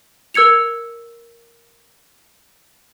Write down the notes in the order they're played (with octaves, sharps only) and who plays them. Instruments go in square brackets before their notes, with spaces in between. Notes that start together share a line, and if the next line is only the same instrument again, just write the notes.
[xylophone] A#4 E6 G#6 C#7 F7